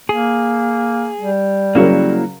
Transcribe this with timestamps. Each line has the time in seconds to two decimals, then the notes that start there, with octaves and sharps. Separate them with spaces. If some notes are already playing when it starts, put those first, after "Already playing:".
0.09 A#3 G#4
1.20 G3
1.75 C#3 F#3 A#3 E4 F#4 A#4